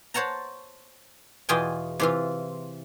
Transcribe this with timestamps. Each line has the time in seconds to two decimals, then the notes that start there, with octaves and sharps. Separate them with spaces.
0.14 C5 C#5 F#5 A5 A#5
1.49 E2 B2 F4 G#4 G5 G#5
2.00 C3 E3 F4